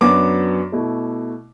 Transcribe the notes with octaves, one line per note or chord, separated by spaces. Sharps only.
F#2 F#3 B3 D4 D6
B2 A3 E4